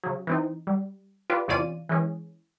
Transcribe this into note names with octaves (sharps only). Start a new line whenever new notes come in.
C#3 F#3
E3 C4 D#4
G3
F4 G4 B4 D5
E2 C3 C#4 F4 D5 D#7
E3 G#3 C#4 G#4